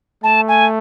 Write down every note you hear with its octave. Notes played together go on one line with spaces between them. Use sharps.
A3 A5
G#5